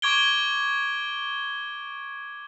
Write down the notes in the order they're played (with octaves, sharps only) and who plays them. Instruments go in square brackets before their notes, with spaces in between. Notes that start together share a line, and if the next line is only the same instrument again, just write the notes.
[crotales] C#6 D6 G#6 D7 G7